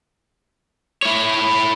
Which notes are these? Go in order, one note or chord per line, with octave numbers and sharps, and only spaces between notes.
E4 C#5